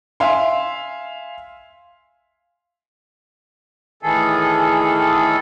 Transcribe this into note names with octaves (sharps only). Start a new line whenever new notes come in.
E5 F5 G#5 C6
A2 D#3 E3 G#4 A4